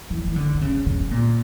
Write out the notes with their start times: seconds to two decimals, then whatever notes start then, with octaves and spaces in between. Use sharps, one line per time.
0.10 E3
0.27 E3
0.36 D3
0.55 D3
0.61 C#3
0.86 C#3
1.11 A#2